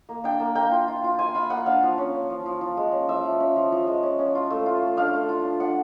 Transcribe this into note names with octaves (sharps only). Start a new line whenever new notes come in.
A#3
D4 G5
A#3
A#3 G5
F4
F4
F4
F4 G#5
F4 B5
A#3 F#5
D4 F5
F3
C#4
C#4
F3
F3
F3
G#3
C#4
F3 E5
F3
C#4
F3
F3
G#3
C#4
C#4
F4
A3
F4
A3
D4 F5
A3
F4
D4
D4 F#5